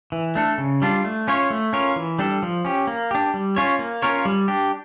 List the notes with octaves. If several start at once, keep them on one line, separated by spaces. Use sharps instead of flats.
E3
A3 D4 A4
C#3
G3 D4 F4
A3
C#4 F4 C#5
A3
C#4 F4 A#4 C#5
E3
G3 D4 A4
F3
C#4 G4
A#3
D4 G4
G3
C#4 F4 C#5
A#3
C#4 F4 A#4 C#5
G3
D4 G4